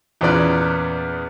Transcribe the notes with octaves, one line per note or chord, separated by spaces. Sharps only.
E2 A#2 B3 C#4 D5 F#6